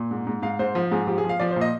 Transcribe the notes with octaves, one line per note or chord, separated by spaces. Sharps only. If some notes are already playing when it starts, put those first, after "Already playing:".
Already playing: A#2
G#2
G#2
G#2 F5
G#2 C5
F3
G#2 G#4
F3 G4
G#4
F3
F5
F3 D5
A#2 C5
D#5